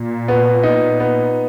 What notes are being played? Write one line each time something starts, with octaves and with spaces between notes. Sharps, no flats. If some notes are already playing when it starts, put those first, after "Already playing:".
Already playing: A#2
B3
D#4
B3